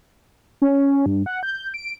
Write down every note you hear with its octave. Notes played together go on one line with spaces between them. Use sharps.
C#4
G2
F#5
G6
D7